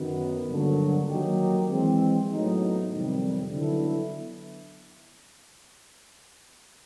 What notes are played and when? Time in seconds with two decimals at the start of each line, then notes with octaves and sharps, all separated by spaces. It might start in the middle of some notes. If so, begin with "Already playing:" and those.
Already playing: F#2 D#3 F#3 B3
0.49 G2 D3 F#3 A#3
1.09 D#3 F#3 A#3 D#4 G4
1.69 E3 G#3 C4
2.30 A2 F#3 B3 D#4
2.91 F2 C3 D#3 G3 C4
3.51 D3 F#3 B3 E4 A4